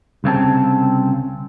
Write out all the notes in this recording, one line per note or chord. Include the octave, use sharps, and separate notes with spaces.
C2 C#3 C4 A5